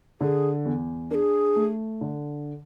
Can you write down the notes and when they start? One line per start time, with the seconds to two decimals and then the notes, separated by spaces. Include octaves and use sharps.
0.21 D3 G#4
0.65 E2
1.11 D4 A#4
1.15 G#4
1.56 A3
2.01 D3